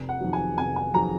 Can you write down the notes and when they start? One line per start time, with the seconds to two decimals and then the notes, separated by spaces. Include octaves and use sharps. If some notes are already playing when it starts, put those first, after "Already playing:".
Already playing: F1
0.09 F#5
0.20 F2 D#3 F#3
0.33 G#5
0.57 F1 G#5
0.76 G#5
0.94 F2 D#3 F#3 A#5